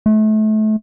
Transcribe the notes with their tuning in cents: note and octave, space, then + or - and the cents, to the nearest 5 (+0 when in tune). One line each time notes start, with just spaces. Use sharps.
A3 -30